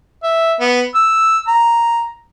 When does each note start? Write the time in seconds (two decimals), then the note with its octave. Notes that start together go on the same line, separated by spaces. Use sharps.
0.23 E5
0.60 B3
0.95 E6
1.48 A#5